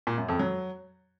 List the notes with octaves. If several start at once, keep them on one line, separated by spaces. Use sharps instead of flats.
A#2
F#2
F2
F#3